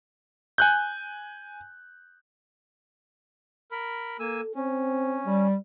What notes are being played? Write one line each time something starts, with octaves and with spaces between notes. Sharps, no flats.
G#5 F#6 G6
A#4 B5
A#3 A4 G#5 E6
C4 C#4
G3